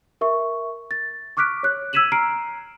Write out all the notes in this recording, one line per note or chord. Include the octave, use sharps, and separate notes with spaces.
A#4 E5 C#6
A6
C#6 D6 F6 F#6 B6 D7
C#5 F#6
E6 G#6 B6 D#7 E7 F#7
A#5 F6 C7 D7